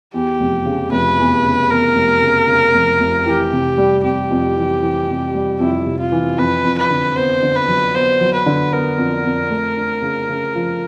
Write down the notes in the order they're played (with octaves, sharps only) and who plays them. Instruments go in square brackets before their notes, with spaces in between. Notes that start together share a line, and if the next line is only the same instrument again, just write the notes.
[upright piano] E2 [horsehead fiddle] G4
[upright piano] F1
C#3
[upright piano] F1 [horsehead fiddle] B4
[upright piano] E2
C#3
[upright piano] E2 [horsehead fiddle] A#4
[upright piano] F1
C#3
C#3
F1
F1
[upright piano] E3 [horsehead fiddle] G4
[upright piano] C3
G3
[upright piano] C3 [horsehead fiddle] G4
[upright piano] F2
E3
E3
C3
G3
[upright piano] F2 [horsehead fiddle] E4
[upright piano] C3
[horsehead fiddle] F4
[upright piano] E3
[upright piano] F2 [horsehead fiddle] B4
[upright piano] F2
[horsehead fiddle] B4
[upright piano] D3
[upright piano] B3 [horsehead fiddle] C5
[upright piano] D3
[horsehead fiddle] B4
[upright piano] F#3
[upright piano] B3 [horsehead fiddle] C5
[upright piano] F#3
[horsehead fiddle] B4
[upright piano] D3
[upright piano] B3 [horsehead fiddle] A#4
[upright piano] F2
F2
A3
D4
C#3
C#3
F3